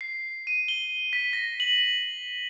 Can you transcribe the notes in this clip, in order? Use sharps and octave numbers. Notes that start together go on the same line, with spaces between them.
C7
D#7
G7
B6
A#6
F#7